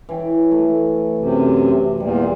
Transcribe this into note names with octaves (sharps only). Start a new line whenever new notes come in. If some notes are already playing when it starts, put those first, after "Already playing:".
E3 C#5 G5
A3
F#2 C3
E2 A#2 G3